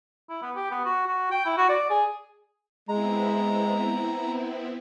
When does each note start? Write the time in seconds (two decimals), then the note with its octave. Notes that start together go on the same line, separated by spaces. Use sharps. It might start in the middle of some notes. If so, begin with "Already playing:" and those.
0.29 E4
0.42 B3
0.55 G4
0.71 B3
0.85 F#4
1.07 F#4
1.31 G5
1.45 E4
1.57 F#4
1.69 D5
1.90 G#4
2.88 G#3 B3 C4 E4 A#5